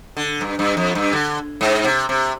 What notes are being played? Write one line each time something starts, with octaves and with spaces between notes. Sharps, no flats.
D3
G2
G2
F2
G2
D3
G#2
C3
C3